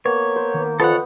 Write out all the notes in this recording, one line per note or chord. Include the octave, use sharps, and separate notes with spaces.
A#3 B3 C#5
C5
D#3
F2 B3 A4 C#5 F#5